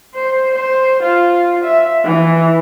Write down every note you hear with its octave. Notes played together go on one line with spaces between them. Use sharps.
C5
C5
F4
E5
E3